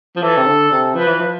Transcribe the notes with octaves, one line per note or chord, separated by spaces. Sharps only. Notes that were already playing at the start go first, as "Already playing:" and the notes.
F3
E3 A4
C3
D3
C3
F3 B4
E3
F3